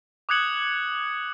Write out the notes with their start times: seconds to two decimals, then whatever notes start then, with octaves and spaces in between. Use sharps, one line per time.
0.29 D6 D#6 F#6 G#6 C#7 F#7